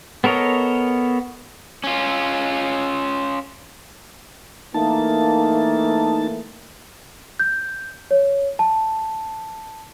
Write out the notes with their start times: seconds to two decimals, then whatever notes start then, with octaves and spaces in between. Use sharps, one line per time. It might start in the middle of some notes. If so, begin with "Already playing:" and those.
0.24 B3 A4 A#4 C#5 D#5
1.84 C#4 F4
4.74 E3 A3 A#3 D#4 A5
7.39 G6
8.11 C#5
8.59 A5